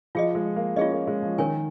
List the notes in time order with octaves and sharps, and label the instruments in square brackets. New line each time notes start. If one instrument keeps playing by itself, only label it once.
[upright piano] F3 [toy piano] F4 G#4 D#5
[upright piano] G#3
A#3
[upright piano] C#4 [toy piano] F4 G#4 D#5
[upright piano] A#3
G#3
F3
[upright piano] D#3 [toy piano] C#4 A#4 C#5 G#5